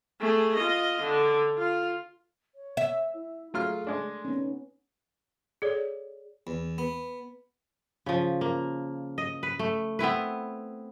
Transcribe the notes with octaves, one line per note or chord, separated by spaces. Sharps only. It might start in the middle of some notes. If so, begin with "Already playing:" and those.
A3 G#4
F4 D#5
D3
F4
C#5
E5
E4
F#3 A3 F4 G#4 F6
G#3 D4
B3 C#4 D#4
G#4 A4 C#5 D5
E2
B3
C#3 F3
A#3
D#5
B4
A3
B3 C4 E4 B4